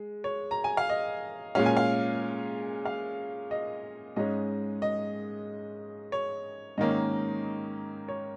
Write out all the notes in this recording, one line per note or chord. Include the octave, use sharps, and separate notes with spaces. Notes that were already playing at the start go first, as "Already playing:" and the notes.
Already playing: G#3
C#5
A#5
G#5
F5
D#5
A#2 G#3 C#4 F5
G#5
F5
F5
D#5
G#2 G#3 C#4 D#5
D#5
C#5
G#2 D#3 A#3 C#4 D#5
C#5